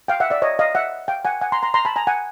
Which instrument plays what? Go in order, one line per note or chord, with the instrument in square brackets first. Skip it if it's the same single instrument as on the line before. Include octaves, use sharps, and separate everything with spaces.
[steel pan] F5 G5
E5 F#5
D5 E5
C#5 D#5
D#5 F5
E5 F#5
F5 G5
F#5 G#5
F#5 G#5
A#5 C6
A#5 C6
A#5 C6
A5 B5
G#5 A#5
F#5 G#5